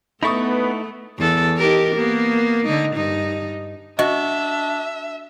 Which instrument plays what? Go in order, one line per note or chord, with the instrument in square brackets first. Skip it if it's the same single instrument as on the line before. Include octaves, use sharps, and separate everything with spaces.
[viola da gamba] A3 [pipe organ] B3 [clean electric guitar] D#4 E4 A4 [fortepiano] B5 C#6 D#6
[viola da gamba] E2 A4
D#4 G4 A#4
A#3 B3
D3 D#4
G2 D#4
[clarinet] D4 [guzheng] F#4 [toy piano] D#5 [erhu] E5